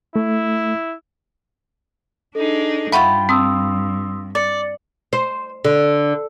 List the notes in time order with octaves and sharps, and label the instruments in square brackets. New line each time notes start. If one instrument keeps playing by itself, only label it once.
[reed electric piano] A3 [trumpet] E4
[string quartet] D4 D#4 G#4 [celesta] A4
[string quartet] G2 [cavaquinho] F4 G5 B5 [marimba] E5 F#5 C#6
[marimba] C4 [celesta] C6 D#6 E6
[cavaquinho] D5 [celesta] A6 C#7
[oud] C5
D3